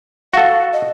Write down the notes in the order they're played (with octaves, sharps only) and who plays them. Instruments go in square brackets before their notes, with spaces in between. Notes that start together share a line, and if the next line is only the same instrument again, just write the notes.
[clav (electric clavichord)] F#4 A4 [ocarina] F5
[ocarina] D#5